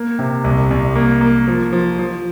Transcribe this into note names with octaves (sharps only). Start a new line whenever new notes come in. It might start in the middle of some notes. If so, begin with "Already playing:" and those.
Already playing: A#3
C3
C2
C2
A#3
A#3
F3
F3
F3